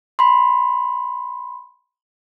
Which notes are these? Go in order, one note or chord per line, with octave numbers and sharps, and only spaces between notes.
B5 C6